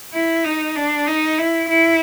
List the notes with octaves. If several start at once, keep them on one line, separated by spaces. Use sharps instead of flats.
E4
D#4
D4
D#4
E4
E4